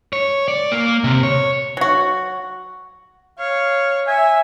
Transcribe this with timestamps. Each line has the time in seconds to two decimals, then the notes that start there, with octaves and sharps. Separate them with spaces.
0.13 C#5
0.48 D5
0.71 A#3
1.04 C3
1.23 C#5
1.77 F#3 F#4
3.39 C#5 F5
4.07 E5 G#5